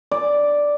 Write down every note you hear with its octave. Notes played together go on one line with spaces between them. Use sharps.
D5